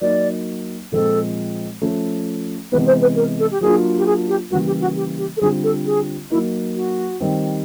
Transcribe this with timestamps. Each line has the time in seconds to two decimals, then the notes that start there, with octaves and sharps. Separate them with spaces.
0.01 F#3 A#3 D#4 D5
0.92 A#2 F3 G#3 C4 A4
1.82 F3 A3 C#4
2.72 C3 E3 G#3 B3 B4
2.86 C5
3.02 B4
3.16 A#4
3.39 A4
3.51 G4
3.61 F#3 A#3 D4 F4 G#4
3.98 G4
4.06 G#4
4.28 G4
4.50 C#3 E3 G3 A#3 F#4
4.66 G4
4.81 F#4
4.96 G4
5.18 G4
5.37 A4
5.41 D3 G3 C4 F4 G#4
5.64 A4
5.86 G#4
6.30 F#3 A#3 D#4 E4
6.76 F#4
7.20 D#3 G3 C4